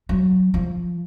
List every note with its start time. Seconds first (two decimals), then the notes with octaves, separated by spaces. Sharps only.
0.09 F#3
0.54 F3